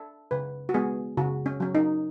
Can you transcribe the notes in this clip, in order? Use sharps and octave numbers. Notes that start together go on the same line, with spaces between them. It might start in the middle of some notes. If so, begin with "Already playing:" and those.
Already playing: A4
C#3 B4
F#4
G#3 B3 G#4
C#3 F#4
C#4
F#3 C#4
D#4